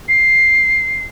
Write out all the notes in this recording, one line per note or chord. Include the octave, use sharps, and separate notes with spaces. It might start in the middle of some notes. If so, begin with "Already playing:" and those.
C7